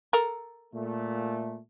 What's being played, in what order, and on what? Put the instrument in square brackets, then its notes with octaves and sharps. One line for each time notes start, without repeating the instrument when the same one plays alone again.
[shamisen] A4 A#4
[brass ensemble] A#2 A3